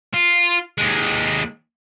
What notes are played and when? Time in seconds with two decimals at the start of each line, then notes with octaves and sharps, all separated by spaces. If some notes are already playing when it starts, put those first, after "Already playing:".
0.14 F4
0.78 D#2 G#3